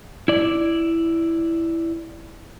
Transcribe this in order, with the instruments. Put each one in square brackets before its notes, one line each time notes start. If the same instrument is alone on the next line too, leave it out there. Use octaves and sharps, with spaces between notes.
[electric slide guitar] E4 D5